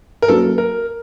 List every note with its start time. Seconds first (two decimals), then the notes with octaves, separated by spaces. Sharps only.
0.22 A#4
0.28 F#3 A#3 C#4 F#4 A4 B4
0.58 A#4